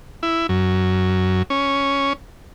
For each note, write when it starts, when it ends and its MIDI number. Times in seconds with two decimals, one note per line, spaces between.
0.23 0.47 64
0.49 1.43 42
1.50 2.13 61